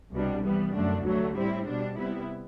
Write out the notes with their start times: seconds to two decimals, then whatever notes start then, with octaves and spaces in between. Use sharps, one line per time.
0.12 C2 B2 G3 D4
0.43 E3 G3 B3
0.74 F#2 D3 A3 D4
1.04 D2 D3 F#3 A3
1.35 A2 G3 C4 E4
1.66 B2 G3 D4
1.96 C3 G3 B3 E4